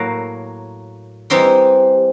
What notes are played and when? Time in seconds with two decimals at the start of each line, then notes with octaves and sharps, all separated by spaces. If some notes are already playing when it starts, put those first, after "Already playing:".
Already playing: A2 F#3 A#3
1.30 E3 G3 C4 D#4 G4